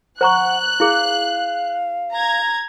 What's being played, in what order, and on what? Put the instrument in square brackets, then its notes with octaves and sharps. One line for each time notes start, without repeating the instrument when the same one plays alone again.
[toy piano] C5 A#5 C#6 [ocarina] F#5 [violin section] F#6
[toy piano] E4 G#4 [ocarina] F5
[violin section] A#5 G#6